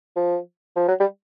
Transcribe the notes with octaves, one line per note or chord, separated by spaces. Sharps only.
F3
F3
F#3
G3